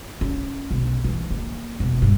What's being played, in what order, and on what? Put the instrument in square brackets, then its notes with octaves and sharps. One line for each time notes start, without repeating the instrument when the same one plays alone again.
[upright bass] C#4
B1
E3
A#3
E1
G2